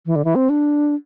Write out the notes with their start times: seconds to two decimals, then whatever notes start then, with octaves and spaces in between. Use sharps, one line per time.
0.06 E3
0.16 D3
0.25 E3
0.35 C4
0.49 D4